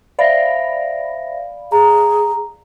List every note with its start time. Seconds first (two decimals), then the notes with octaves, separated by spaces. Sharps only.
0.19 C5 D5 E5 F5 B5 A#6
1.72 G#4 A#5